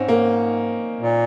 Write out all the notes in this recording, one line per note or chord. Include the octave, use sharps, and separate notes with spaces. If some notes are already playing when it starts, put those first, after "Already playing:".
Already playing: G#2 C4 C#4 D#4
A#3
A#2